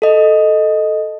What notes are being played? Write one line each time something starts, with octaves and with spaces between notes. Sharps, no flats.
A4 D#5